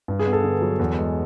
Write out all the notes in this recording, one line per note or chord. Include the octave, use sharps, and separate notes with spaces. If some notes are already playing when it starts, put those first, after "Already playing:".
G2
G#4
B3
A4
D3
F#3
E2
G#3